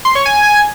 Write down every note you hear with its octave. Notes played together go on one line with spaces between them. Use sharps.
C6
C#5
G#5